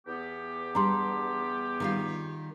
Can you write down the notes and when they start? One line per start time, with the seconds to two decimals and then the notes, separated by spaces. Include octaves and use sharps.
0.06 E2 B3 G4
0.75 G3 D4 A#5 C6
1.80 D#3 G3 F4